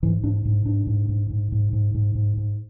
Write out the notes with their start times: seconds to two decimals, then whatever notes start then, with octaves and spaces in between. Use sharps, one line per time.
0.03 G#2 E3
0.24 G#2 D4
0.45 G#2
0.65 G#2 D4
0.87 G#2
1.09 G#2
1.30 G#2
1.52 G#2
1.73 G#2
1.94 G#2
2.15 G#2
2.37 G#2